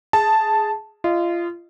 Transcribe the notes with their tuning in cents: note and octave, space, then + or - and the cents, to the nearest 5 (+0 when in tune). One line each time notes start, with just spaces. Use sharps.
G#4 +0 A5 +0
F4 -25 D#5 -10